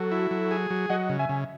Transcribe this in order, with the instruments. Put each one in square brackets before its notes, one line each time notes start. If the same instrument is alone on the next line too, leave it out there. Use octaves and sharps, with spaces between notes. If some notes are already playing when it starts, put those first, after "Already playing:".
Already playing: [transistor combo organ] F#3 [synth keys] F#4 A4
[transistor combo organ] E4
F#3
G#4
F#3
[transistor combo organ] F#3 [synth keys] D#5 F#5
[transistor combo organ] C#3
[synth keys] E5 G#5
[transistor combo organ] C#3